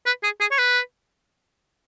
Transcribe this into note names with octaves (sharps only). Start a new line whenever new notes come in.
B4
G#4
G#4
C#5
B4